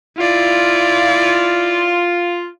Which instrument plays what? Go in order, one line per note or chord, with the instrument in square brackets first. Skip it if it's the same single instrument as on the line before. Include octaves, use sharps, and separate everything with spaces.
[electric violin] E4 D5 [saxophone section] F4